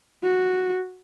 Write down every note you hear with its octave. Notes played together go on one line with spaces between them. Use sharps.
F#4